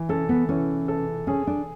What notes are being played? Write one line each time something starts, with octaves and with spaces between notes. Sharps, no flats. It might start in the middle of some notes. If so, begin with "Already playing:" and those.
Already playing: E3
C#4 A4
B3
E3 C#4
A4
C#4 G#4
D4